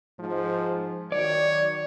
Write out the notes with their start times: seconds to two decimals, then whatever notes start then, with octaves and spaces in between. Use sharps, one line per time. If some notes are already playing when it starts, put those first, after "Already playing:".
0.19 G#2 F3
1.12 D#3 F#3 C#5 D5